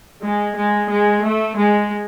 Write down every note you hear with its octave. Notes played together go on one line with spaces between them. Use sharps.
G#3
G#3
G#3
A3
G#3